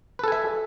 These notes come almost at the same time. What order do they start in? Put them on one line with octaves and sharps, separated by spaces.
B4 A4 G#5 E5